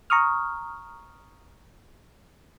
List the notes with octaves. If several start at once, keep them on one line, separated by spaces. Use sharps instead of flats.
A#5 C#6 D#6 F6